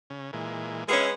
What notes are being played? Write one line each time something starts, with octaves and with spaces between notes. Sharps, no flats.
C#3
A#2 E3 G#3
G#3 B3 C#4 G#4 D#5 E5 F6